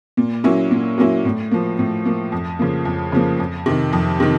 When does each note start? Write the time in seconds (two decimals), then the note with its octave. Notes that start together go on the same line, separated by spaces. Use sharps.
0.17 A#2
0.44 F#3 A#3 C#4 E4
0.71 A#2
0.98 F#3 A#3 C#4 E4
1.25 A2
1.51 F3 A#3
1.79 A2
2.05 F3 A#3
2.32 F2
2.59 C#3 F3 A#3
2.85 F2
3.12 C#3 F3 A#3
3.40 F2
3.66 C3 D#3
3.93 F2
4.20 C3 D#3